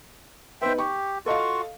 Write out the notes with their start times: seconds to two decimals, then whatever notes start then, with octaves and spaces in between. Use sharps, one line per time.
0.62 B3 D#4 B4 C5 E5 G5
0.78 G4 C#6
1.26 F4 F#4 A4 D#5 F5 C#6